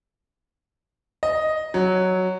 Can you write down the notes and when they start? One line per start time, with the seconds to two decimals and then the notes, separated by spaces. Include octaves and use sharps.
1.23 D#5
1.74 F#3